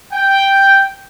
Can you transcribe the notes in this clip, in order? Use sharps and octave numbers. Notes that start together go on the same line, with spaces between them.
G5